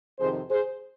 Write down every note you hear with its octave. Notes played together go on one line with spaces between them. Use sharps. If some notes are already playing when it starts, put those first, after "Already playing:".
F2 C3 D#3 G#4 C5
G#4 C5